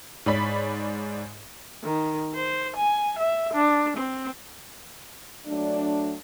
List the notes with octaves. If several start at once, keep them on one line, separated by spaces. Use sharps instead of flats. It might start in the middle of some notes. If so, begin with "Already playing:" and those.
G#2 C#5 D5 B5 B6
D#3
C5
G#5
E5
D4
C4
F#3 A3 D4